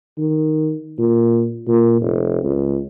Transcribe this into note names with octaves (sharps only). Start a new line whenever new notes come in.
D#3
A#2
A#2
F1
C#2